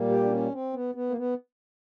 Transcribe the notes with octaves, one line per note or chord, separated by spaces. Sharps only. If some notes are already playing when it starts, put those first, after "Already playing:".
Already playing: A#2 G3 A#3
G4
D4
C#4
C4
B3
B3
A#3
B3